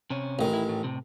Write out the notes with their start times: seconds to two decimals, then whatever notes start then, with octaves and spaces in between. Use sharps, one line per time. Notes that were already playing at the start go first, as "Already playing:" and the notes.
0.10 C3 C#4
0.39 A1 D#3
0.53 E4
0.69 A2
0.84 A2 C3